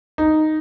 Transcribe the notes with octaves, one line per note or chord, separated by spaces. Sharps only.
D#4